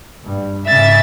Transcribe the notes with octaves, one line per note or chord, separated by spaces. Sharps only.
G2
G#2 C#3 E5 A6